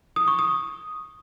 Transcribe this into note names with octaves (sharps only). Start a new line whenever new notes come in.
D#6
C#6
D#6